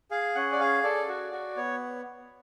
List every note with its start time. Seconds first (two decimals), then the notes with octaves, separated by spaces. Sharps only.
0.11 G#4 F5
0.35 C#4 F#5
0.52 D5
0.60 G#4 F5
0.83 A4 D5
1.08 F#4
1.32 F#4
1.56 B3 C#5